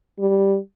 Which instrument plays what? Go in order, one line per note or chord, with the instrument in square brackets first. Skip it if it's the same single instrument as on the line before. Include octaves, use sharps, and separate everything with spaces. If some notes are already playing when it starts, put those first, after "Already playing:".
[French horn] G3